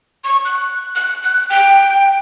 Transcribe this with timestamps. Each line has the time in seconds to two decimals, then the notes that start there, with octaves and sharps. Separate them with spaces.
0.24 C#6
0.45 F#6
0.96 F#6
1.24 F#6
1.50 G5